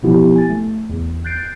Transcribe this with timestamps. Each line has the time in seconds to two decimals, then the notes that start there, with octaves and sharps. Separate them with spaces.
0.03 B2 F3 B3 E4 G4
0.36 G#5 A6
0.49 A3
0.89 E2
1.24 F#6 G6 A6 C7 D7